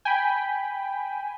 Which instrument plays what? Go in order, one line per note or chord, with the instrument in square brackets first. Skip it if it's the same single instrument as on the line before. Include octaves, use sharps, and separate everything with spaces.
[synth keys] G5 B5 [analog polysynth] G#5